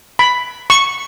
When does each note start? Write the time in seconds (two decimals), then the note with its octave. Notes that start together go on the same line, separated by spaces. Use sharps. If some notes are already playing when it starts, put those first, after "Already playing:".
0.19 B5
0.70 C#6